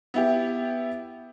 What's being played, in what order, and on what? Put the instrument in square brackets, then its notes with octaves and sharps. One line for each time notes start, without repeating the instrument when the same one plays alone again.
[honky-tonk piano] B3 E4 G4